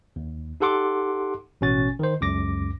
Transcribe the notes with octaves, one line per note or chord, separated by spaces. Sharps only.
D#2
D#4 G4 A4 F#5 C6 D6
A1 B2 C#4 F#4 A6
D#3 C5
C#2 F#2 D6 A#6